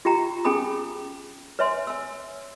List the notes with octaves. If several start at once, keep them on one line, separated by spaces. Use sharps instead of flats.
F4 G4 G5 A#5
C#4 G#4 G5 G#5 B5 D#6
B4 C#5 E5 G#5 C6
G#5 E6